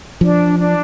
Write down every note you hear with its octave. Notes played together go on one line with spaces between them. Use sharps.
F3 D4
D4